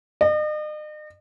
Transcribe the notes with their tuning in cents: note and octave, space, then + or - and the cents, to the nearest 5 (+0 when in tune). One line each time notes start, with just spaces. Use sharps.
D#5 -40